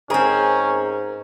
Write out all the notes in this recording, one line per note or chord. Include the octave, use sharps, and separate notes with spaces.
G#2 C4 C#4 G#4 A#4